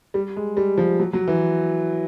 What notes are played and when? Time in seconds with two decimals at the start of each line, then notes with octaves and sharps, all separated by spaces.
0.14 G3
0.36 G#3
0.57 G3
0.78 F3
0.99 F#3
1.13 F#3
1.28 E3